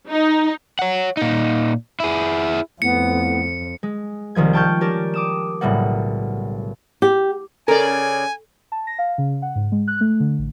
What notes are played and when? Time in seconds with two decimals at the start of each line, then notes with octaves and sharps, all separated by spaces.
0.10 D#4
0.79 C#5 F#5
1.17 A#2 D#4
2.00 E4 G#4
2.82 F2 A2 B3 C#7
3.83 G#3
4.35 C2 D#3 F3 G#6
4.53 G5 A5 C#6 F6 G6 G#6
4.81 C#4 G4 A#4 D5 A5
5.14 D6 D#6 E7
5.61 B1 A2 C#3 G3 A#3 F#5
7.02 G4
7.68 C#3 A4 A#4 D5 G#5
8.72 A5
8.87 A#6
8.98 F5
9.18 C#3
9.42 F#5
9.56 G#2
9.72 G#3
9.88 F#6
10.01 A3
10.20 D3
10.39 A1